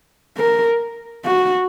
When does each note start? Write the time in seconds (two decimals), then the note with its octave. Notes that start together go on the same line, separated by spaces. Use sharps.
0.37 A#4
1.25 F#4